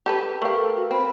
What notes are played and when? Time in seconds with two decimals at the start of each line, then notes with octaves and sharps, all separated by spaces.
0.06 G4 A4 B4
0.42 A3 G4 A#4 B4 F5
0.56 A4
0.76 F#4
0.91 C4 B5